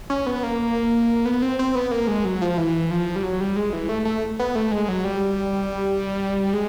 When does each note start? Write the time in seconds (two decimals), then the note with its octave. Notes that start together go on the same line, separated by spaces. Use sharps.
0.10 C#4
0.26 B3
0.43 A#3
1.25 B3
1.42 C4
1.59 C4
1.75 B3
1.91 A#3
2.07 G#3
2.25 F#3
2.42 F3
2.58 E3
2.91 F3
3.16 G3
3.23 F#3
3.41 G3
3.56 G#3
3.73 E3
3.89 A3
4.05 A3
4.39 B3
4.55 A3
4.71 G#3
4.88 F#3
5.04 G3
6.53 G#3